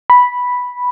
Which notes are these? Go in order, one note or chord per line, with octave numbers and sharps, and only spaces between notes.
B5